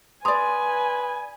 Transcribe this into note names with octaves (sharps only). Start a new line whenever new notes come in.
B4 D5 G#5 A#5 C6 D#6